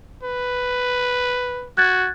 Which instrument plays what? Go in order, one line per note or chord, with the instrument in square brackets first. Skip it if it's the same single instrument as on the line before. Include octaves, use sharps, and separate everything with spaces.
[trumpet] B4
[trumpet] F#4 [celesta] F#6 G#6 A6